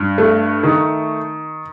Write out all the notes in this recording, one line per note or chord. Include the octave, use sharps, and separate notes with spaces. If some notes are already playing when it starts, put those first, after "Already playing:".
Already playing: G2
A3
D#3